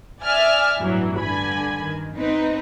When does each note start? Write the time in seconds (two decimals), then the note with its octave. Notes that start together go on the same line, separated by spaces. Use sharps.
0.23 D5 E5 G#5 F6
0.79 A1 E2 G2 E3 F#3
1.20 G2 D3 G#5 B5
1.82 D#3
2.16 C4 D#4 B4